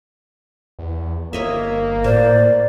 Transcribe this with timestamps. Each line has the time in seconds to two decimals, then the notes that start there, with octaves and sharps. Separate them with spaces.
0.79 E2
1.33 G1 A#3 C#5 D#5 E5
2.04 A2 C5 D5